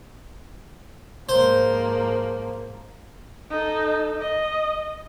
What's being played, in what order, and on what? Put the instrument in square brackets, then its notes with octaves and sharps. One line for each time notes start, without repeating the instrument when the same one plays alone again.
[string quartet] G#2 F3 A#3 [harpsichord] C5
[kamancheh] D#4 A4
D#5